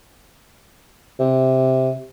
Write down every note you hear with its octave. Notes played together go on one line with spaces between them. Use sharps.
C3